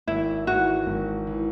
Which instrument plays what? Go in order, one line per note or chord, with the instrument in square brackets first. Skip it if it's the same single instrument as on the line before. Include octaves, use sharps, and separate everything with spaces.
[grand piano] G#1 [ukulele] E4
[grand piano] G#2 E3 [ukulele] F#4
[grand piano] G#1
E3